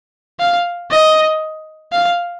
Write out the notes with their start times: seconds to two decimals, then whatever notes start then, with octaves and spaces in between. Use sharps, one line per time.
0.40 F5
0.91 D#5
1.92 F5